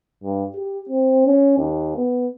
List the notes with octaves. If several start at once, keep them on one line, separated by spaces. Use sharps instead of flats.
G2
G4
C4
C#4
D#2
B3